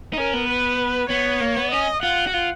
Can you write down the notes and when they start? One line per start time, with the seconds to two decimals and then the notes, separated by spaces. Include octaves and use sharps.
0.13 D#4
0.17 C#4 A#4
0.33 B3
0.49 B4
1.10 B3 C#5
1.41 A#3
1.57 B3
1.71 C#4 D#5
2.03 F4 F#5
2.27 F#4
2.34 F4